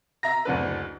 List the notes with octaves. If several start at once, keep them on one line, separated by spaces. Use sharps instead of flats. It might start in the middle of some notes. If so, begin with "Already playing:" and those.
E5 A#5 A#6
F#1 D2 F#3 D4 B4